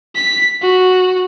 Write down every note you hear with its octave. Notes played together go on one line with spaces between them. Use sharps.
B6
F#4